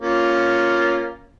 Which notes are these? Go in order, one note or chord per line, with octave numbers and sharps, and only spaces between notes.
A#3 C#4 F4